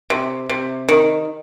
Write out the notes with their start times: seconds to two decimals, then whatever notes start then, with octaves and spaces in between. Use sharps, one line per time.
0.10 C3
0.49 C3
0.89 D#3